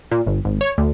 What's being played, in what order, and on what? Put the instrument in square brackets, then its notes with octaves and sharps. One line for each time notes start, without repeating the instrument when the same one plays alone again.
[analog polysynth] A#2
G1
G#1
C#5
D2